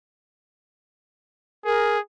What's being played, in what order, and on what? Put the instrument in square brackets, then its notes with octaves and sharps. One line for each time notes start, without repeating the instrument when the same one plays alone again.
[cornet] G#4 [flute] A#4